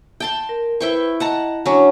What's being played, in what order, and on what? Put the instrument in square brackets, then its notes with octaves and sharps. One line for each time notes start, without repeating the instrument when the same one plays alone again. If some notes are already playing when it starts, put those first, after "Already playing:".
[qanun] G5 A5 C6
[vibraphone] A#4
[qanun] E4 G5 C#6 [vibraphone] B4 C5
[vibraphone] D#5 [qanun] F#5 A5 A#5
[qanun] F#3 C#4 [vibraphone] D4 A#5 C#6